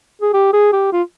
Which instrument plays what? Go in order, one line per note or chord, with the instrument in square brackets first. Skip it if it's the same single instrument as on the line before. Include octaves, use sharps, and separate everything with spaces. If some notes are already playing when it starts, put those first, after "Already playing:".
[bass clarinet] G#4
G4
G#4
G4
F4